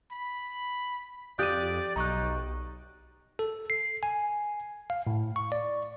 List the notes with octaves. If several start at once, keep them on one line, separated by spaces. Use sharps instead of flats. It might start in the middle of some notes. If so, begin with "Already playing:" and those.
B5
F2 G4 D5 F5 D#6 F#6 D#7
B1 D#4 A#5 C#6 F#6
A4
C7
G#5
F5
A2
C#6
D5